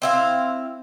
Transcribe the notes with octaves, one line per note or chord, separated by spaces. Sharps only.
C4 E4 F5